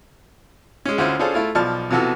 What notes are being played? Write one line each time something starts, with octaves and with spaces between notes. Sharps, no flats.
G#3 C#4
D2 C#4 E4 F4 C5
C#4 D4 F4 G#4 A4 C5
A3 E4 F4
B1 F3 D5 A5 F6
C3 E3 F3 B3 F#4 A4